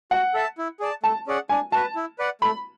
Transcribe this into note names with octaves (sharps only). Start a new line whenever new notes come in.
F#4 F#5
A4 E5 A5
E4
G#4 D5 A5
A3 A5
C#4 G#4 D5 F#5
D4 G#5
F#4 B4 A5
E4
B4 D5 F#5
A3 B5